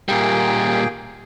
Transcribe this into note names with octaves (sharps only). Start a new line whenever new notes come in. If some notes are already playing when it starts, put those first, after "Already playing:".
A#2 G3 A#3 G#4 G5